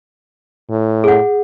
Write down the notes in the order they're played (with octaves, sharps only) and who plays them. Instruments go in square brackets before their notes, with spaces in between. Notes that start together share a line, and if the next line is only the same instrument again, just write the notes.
[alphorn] A2
[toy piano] G#4 F#5